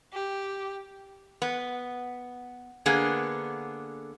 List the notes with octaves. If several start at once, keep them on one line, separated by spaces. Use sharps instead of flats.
G4
B3
D3 A#3 B3 G#4